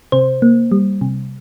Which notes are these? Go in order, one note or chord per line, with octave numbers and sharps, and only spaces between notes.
C3 C5
A#3
G3
C3